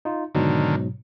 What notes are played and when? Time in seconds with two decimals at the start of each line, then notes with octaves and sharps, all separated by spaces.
0.05 D#4 F4
0.35 G#2 B2 D3 D#3 F#3